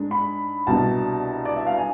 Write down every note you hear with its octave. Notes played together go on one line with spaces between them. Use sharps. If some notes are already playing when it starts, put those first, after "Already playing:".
Already playing: G#2 G#3 D4
B5
C2 B2 B3 D4 A5
D5
E5
F5
G#5